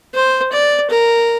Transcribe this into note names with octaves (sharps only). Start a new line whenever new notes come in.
C5
D5
A#4